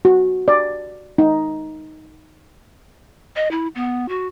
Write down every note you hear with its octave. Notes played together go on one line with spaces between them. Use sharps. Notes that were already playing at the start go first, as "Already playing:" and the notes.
F#4
D5
D#4
D#5
E4
B3
F#4